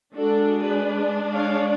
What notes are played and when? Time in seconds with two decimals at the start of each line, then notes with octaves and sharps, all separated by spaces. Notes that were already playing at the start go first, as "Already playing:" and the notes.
0.17 G#3 D4 F#4 A4
0.61 G#4 B4
1.34 C#5 F5